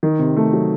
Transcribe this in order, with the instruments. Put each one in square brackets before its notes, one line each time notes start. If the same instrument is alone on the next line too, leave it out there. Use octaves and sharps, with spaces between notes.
[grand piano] D#3
C3
A3
F#3